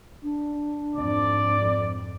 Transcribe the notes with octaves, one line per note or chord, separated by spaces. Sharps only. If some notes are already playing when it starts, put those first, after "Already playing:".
D4
F2 G#2 D5